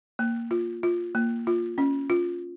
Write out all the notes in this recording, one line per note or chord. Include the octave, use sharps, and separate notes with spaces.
A#3
F4
F4
A#3
F4
C#4
F4